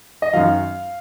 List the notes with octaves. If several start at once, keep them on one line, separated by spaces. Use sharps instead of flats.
D#5
F#2 D#3 F#3 F5